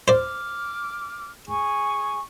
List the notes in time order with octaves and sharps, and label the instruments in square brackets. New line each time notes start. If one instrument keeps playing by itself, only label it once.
[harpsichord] C5 D5 [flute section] D6 F6
[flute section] G#4 G#5 C#6